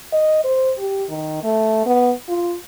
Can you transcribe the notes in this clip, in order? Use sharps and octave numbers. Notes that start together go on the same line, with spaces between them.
D#5
C5
G4
D#3
A3
B3
F4